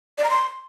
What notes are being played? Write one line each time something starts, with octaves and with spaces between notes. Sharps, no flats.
D5
A#5
C6